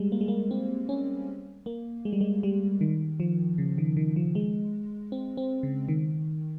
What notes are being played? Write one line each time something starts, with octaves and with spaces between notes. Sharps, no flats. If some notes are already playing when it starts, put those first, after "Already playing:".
Already playing: G3 G#3
A#3
G#3
A#3
C4
C#4
A#3
G#3
G3
G#3
G3
D#3
F3
C#3
D#3
D#3
F3
G#3
C4
C4
C#3
D#3